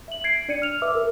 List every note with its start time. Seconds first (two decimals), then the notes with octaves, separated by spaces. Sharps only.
0.08 E5 F#7
0.24 G#6 C7 D7
0.48 D4 D5 G#6 C#7 D#7
0.62 F6 F7
0.82 B4 E5 D6 E6
0.95 A#4